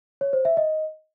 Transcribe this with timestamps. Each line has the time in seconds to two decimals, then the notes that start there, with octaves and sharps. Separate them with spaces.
0.21 C#5
0.33 C5
0.45 E5
0.57 D#5